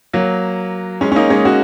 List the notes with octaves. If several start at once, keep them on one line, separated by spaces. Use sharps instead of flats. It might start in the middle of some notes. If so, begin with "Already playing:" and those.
F#3 A#3
G#3 C#4
C#4
A#3 D#4
G#3 C#4
C#4 F#4